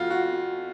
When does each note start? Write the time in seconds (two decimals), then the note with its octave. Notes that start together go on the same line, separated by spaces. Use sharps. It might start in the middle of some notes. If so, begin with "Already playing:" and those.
Already playing: F2 F3 A3 F4 F#4
0.10 F#4